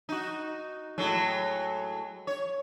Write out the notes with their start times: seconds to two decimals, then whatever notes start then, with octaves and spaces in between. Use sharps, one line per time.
0.09 D#4 F#4
0.98 A2 F#3 G#3
2.27 C#5